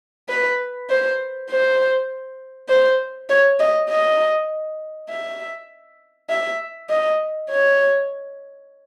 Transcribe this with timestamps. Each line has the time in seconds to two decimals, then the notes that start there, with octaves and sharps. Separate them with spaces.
0.29 B4
0.90 C5
1.50 C5
2.69 C5
3.29 C#5
3.60 D#5
3.89 D#5
5.09 E5
6.30 E5
6.90 D#5
7.50 C#5